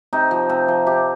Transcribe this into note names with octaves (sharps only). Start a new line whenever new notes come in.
C3 D#4
F3
C3
F3
C3 G4